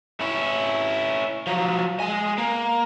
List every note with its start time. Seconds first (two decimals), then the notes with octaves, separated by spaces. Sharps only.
0.21 C#4 E4
1.47 F3 F#3
2.00 G#3 G#5
2.38 A#3